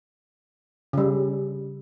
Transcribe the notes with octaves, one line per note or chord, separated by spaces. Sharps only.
C#3 G3